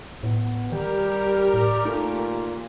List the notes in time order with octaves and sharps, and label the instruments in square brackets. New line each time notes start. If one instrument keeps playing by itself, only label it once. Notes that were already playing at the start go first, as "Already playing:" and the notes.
[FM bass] A2 [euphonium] B3
[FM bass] D#3 [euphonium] G3 [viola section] G4 A#4 [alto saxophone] G5
[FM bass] A2 [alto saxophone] D5
[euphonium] A#2 [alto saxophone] A3 [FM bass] D#4